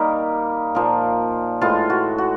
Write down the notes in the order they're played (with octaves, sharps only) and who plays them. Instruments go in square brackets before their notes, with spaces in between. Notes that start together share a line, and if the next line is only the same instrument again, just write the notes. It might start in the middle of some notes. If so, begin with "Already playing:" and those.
Already playing: [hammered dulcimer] D#3 G3 A#3 D#4
A#2 F3 A#3
A2 E3 G#3 F4
F#4
F#4